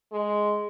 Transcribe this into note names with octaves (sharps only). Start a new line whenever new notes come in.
G#3